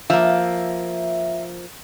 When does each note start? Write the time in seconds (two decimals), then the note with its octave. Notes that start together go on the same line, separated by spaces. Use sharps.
0.10 F3 A#3 E5